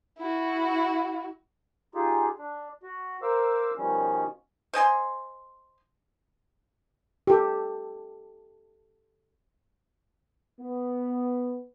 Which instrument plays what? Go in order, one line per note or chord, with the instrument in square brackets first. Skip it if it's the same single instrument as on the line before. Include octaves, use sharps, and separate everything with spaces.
[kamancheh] E4 F#4
[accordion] D#4 F4 G4 G#4
D4
F#4
A#4 C5 F5 D6 E6
B2 D#3 F3 G3 C#4
[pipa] C5 D#5 G#5 C6
[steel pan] G4 A4
[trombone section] B3